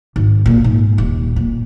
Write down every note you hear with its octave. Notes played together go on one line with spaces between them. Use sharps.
G#1
A#2
G#2
D#1
A#2